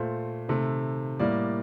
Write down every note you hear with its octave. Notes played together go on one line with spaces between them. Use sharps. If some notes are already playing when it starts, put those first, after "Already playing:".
Already playing: A#2 A3 C5
C3 D#3 A3
A2 G3 A#3 D5